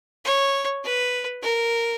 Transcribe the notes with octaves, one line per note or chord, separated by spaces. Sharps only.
C#5
B4
A#4